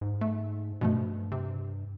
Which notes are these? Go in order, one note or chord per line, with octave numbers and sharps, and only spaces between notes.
G#2
A3
G2 B2 F3 A3
C3